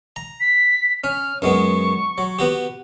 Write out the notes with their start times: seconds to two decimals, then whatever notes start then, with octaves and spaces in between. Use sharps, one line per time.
0.16 A#5
0.40 B6
1.04 C#4 F6
1.42 F#2 G#3 B3 C#6
2.18 F#3
2.39 B3 F#4 G4